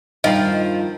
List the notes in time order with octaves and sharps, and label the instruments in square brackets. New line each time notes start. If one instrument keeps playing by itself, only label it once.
[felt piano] G2 G5 [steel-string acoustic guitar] D#3 [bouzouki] F3 [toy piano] D#5 F#5